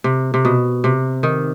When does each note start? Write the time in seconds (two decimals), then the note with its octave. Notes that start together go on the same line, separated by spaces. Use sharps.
0.04 C3
0.34 C3
0.45 B2
0.84 C3
1.23 D#3